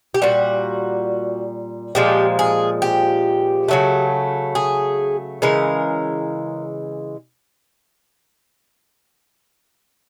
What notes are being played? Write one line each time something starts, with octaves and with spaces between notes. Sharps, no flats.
G4
A#2 G3 F#4
A#2 F3 G#3 G4
G#4
G4
C#3 F#3 A3
G#4
C#3 E3 G#3 A#4